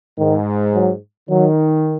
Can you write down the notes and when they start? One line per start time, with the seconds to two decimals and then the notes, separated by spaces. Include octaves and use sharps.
0.18 G#2 D#3
0.74 F#3
1.29 D#3 F#3